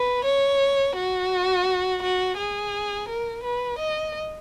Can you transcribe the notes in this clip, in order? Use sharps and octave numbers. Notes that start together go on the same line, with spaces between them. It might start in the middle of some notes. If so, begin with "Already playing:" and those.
Already playing: B4
C#5
F#4
F#4
G#4
A#4
B4
D#5